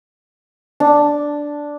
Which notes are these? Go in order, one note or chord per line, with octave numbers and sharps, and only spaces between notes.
D4